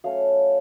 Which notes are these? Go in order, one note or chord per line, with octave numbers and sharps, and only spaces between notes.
F#3 A3 C#4 F5